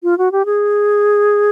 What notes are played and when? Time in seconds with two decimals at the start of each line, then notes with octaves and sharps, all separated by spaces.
0.03 F4
0.18 F#4
0.32 G4
0.46 G#4